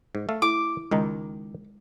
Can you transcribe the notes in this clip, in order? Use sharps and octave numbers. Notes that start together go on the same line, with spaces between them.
G#2
A3 A4 F5
E4 D6
C#2 D#3 G#3 D#4